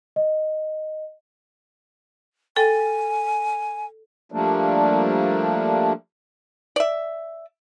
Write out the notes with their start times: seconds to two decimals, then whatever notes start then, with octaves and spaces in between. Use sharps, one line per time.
0.16 D#5
2.56 A4 G5 G#5
4.32 F3 G3 A3 A#3 D4
6.76 D5 E5